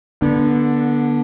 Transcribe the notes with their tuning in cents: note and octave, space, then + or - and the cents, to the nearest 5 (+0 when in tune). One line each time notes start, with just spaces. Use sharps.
D3 +0 B3 -30 D4 +0